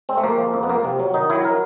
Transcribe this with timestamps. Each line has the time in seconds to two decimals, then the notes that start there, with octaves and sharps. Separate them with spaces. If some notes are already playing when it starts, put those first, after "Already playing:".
0.09 G#3 C4
0.17 A3
0.23 F3 A#3
0.39 F3
0.54 F2
0.63 B3
0.69 F2 A#3
0.84 C3
0.99 F#3
1.14 D#3 D#4
1.30 F#3 E4
1.44 F#3 A#4